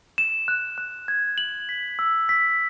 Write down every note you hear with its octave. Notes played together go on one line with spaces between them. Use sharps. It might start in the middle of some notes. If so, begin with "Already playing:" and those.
E7
F#6
F#6
G#6
F#7
B6
E6
B6